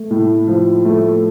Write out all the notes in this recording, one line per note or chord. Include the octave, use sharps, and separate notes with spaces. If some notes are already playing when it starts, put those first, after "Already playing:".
Already playing: A3
A2
F3
A3